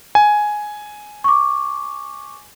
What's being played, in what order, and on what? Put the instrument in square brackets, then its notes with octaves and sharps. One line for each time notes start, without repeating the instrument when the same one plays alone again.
[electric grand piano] G#5
[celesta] C#6 D6